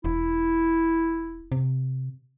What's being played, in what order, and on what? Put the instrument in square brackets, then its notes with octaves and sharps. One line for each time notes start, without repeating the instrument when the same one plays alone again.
[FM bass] E1 [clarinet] E4
[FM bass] C3